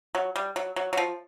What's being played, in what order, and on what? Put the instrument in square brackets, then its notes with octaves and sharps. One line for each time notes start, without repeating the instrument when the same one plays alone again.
[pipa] F#3
G3
F#3
F#3
F#3
F3